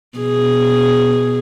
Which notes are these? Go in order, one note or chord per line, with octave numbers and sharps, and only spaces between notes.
B2 G#4